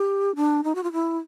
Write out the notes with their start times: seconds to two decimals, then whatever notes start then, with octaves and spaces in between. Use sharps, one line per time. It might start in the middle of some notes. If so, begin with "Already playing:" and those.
Already playing: G4
0.36 D4
0.64 D#4
0.75 F#4
0.84 F4
0.92 E4